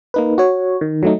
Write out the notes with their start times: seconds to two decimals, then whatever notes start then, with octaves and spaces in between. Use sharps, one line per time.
0.14 A#3 D#4 B4
0.38 F#4 C#5
0.81 D#3
1.03 F#3 A3 D#4